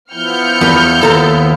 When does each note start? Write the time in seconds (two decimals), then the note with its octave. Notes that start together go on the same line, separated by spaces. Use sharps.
0.13 F3 B3 E4 F6 G6 C#7
0.61 E2 B4
1.01 D#2 A4 A#5